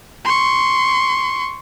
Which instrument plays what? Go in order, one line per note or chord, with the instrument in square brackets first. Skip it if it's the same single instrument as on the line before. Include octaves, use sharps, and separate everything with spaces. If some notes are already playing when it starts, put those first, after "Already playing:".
[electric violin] C6 C#6